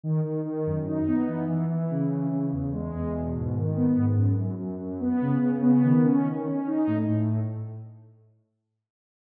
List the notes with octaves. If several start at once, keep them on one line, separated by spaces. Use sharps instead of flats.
D#3
D#3
D#3
F#2
D#4
B3
E3
E3
E3
C#3
E3
C#3
E2
G#3
E2
B2
G#2
D#3
B3
G#2
F#2
F#2
F#2
F#2
B3
C#3
C#3
B3
D#3
C#4
D#3
C#4
D#4
A2
A2